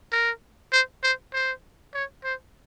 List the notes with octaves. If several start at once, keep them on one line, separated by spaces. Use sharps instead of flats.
A#4
C5
C5
C5
C#5
C5